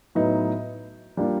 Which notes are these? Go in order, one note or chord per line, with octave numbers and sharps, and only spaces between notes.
A2 F#3 B3 D#4
G3 A#3 D4 F4